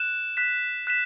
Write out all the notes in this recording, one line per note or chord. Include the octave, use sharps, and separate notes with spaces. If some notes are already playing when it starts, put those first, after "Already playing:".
Already playing: F#6 E7
F#6 B6 E7
F#6 B6 E7